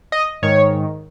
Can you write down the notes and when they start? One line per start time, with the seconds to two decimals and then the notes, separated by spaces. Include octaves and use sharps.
0.12 D#5
0.42 G#2 D#3 C#5